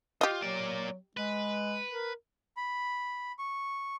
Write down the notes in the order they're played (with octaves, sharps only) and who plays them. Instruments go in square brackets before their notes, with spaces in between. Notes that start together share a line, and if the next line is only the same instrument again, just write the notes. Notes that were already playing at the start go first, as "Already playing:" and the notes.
[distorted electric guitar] F4 [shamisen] G4 D#5
[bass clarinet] F#3 [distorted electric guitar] A#3 D5
[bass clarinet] G#3 [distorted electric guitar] B4
[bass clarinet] A#4
[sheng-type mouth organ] B5
C#6